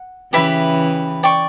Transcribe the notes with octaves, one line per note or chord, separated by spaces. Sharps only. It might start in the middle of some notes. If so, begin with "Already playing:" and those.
Already playing: F#5
C#3 E3 G4 B4 E5 B5
D5 G5 C#6